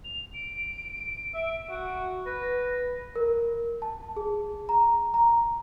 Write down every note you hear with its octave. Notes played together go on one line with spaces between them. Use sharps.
F7
D7
E5
F#4
B4 A#6
A#4
A5
G#4
A#5
A#5